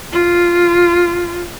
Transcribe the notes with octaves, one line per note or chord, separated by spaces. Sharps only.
F4